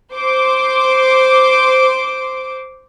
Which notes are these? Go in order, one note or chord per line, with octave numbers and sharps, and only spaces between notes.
C5 D6